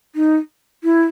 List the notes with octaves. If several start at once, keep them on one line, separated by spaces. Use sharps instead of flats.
D#4
E4